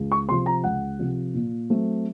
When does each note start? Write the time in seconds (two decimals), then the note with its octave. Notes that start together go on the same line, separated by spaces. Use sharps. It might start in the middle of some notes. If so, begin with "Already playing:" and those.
Already playing: C#2
0.12 C#6
0.28 C3 C6
0.32 F3
0.46 A#5
0.64 C#2 F#5
0.99 C3 F3
1.34 A#2
1.70 F#3 A3 C4